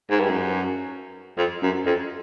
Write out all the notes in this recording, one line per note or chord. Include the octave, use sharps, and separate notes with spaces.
G#2
G2
F#2
F2
F#2
F2